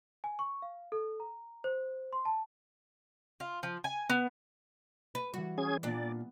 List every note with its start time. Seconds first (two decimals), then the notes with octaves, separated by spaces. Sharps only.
0.24 G#5
0.39 C#6
0.62 F5
0.92 A4
1.20 A#5
1.64 C5
2.13 C6
2.25 A5
3.40 F4
3.63 F3
3.84 G#5
4.10 B3
5.15 B4
5.34 E3 G3 F#4
5.58 C#4 G#4 G#6
5.83 A#2 B3 D4 D5 D#7